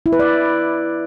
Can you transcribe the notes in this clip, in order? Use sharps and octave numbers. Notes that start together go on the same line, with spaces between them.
E4
B4
D5